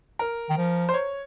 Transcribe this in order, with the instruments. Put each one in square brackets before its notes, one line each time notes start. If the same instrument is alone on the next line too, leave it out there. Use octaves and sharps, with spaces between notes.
[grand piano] A#4
[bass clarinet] D#3
F3
[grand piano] C5
C#5